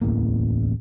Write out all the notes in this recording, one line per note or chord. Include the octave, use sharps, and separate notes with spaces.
D1 A1 E2 A#3